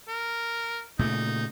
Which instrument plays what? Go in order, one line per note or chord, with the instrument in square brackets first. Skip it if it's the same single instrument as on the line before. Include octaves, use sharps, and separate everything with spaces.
[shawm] A#4
[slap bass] A#2 C#3 A3 [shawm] D#4